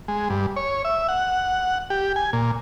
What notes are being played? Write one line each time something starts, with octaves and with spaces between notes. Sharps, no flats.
G#3
G2
C#5
E5
F#5
G4
G#5
A#2